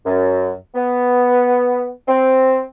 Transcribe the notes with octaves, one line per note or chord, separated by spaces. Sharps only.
F#2
B3
C4